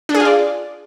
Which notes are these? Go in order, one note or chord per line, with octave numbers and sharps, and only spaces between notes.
D4
G#4
F4
D5